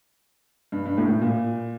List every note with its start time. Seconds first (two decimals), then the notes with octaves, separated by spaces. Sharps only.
0.72 G2
0.86 G2
0.98 A2
1.09 A2
1.21 A#2